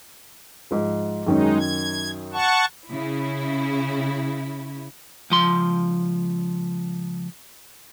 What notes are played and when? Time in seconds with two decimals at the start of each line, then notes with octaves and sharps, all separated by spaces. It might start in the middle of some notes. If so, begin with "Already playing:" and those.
0.71 G#2 F3
1.27 F#2 D#3 G#3 C#4 D#4
1.59 G#6
2.33 F#5 A5 C#6
2.90 C#3 E4
5.30 C#2 F3 C6